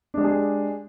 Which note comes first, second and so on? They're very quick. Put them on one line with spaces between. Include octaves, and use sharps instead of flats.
D4 G#3 G4 G#4